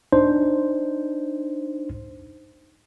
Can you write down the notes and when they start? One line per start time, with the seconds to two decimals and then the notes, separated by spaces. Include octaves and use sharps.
0.13 D4 D#4 C5